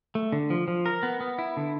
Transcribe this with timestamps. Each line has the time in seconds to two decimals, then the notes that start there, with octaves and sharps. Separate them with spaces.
0.15 A3
0.32 D3
0.50 F3
0.68 F3
0.86 A#4
1.03 B3
1.21 B3
1.39 E4
1.57 D3